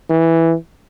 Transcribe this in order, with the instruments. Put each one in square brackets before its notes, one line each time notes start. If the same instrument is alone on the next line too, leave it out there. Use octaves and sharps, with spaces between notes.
[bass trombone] E3